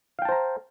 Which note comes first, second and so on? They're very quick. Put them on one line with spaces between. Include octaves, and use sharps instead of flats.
F5 G5 A5 C5 A#5